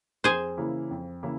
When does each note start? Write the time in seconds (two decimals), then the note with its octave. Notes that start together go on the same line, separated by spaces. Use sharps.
0.24 F2 G#4 C5
0.57 C#3 E3 A#3 E4
0.91 F2
1.23 C#3 E3 A#3 E4